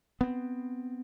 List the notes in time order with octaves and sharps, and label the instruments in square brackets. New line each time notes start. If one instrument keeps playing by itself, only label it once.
[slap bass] B3 C4